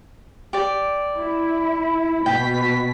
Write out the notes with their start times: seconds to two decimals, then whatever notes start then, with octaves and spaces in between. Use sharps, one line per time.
0.53 G4 D5
1.17 E4
2.26 B2 G5 B6